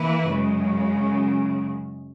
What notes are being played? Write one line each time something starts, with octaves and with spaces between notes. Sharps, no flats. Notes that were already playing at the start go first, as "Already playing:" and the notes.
Already playing: E3 A#3 E4 B4
F#2 C#3 G#3